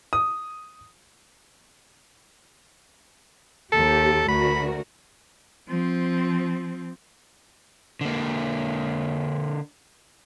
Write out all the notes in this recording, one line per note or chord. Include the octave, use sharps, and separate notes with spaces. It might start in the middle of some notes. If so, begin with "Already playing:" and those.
D#6
D#2 G4 A4
D2 F#4 A#4 B5
F3 C4
D3 A#3